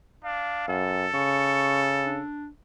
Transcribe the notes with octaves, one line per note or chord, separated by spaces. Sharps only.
D4 F5
F#2 A4
C#3 C#6
D4